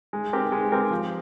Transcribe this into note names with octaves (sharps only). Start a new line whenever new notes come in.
G#3
C4 G4 A#4
G#3
C4 G4 A#4
F3